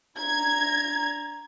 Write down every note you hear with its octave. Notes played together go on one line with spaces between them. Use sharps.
D4 A#5 G#6